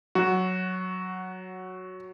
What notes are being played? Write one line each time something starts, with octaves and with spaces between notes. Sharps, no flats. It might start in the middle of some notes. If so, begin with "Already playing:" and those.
F#3 F#4